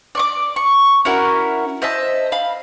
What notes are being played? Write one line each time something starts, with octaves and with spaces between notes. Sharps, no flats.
D5 C#6 D6
C#6
C#4 E4 F#4 A#4
C5 D#5 E5 A5
F5 B5